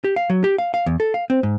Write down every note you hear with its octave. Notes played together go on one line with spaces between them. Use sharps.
G4
F5
F#3
G4
F5
F5
E2
A4
F5
C4
G#2